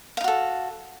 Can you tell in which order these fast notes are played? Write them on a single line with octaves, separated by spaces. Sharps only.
F5 D#4 F#4 A4